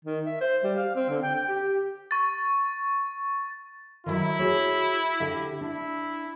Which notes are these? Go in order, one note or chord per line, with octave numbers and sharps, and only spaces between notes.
D#3
E5
C5
G3
F5
C4
D3
G5
G5
G4
C#6 A6
D#3 E3 F#3 E4
F#4 G#4 C#5
D3 G4 E5
D4 E4